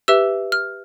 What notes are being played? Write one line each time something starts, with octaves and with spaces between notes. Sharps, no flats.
G4 B4 E5 E6
F6